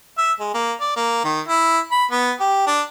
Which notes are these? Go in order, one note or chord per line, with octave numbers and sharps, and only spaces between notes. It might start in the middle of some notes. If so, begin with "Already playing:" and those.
E5
G#3
A#3
D5
A#3
D#3
E4
B5
B3
G4
D4